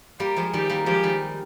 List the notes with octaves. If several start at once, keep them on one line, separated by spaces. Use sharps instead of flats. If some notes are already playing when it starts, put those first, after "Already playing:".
G3 A#3 G4
F3 G#3
D#3 G3 G4
G3 A#3
F3 G#3 G4
D#3 G3